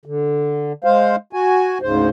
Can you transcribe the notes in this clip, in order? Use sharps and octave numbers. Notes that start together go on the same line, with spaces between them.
D3
G#3 C5 F5
F#4 G#5
D2 G#2 C#3 C5